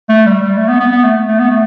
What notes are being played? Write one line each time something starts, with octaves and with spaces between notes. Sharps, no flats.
A3
G3
G3
A3
B3
B3
B3
A3
A3
B3
A3